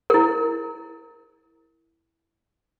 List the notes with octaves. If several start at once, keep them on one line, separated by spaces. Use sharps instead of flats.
E4 A#4